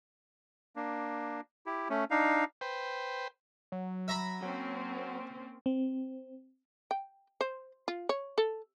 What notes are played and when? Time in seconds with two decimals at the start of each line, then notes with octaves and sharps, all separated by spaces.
0.76 A#3 D4
1.66 E4 G4
1.90 A3 C#4
2.11 D4 D#4 F5
2.61 B4 C5 G5
3.72 F#3
4.08 E5 A#5 B5
4.42 F#3 A#3 C4 C#4
5.66 C4
6.91 G5
7.41 C5
7.88 F4
8.09 C#5
8.38 A4